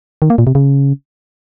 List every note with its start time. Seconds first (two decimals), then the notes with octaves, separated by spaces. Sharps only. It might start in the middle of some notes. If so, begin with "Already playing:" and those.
0.22 D#3
0.30 A#3
0.38 A#2
0.47 C3
0.55 C#3